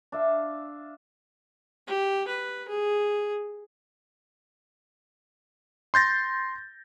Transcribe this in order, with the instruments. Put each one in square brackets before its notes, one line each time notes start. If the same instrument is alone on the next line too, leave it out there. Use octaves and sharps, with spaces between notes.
[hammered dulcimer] D4 E5 F5
[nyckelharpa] G4
B4
G#4
[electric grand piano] C6 G6 A6 A#6